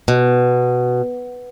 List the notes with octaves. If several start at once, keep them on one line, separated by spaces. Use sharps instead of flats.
B2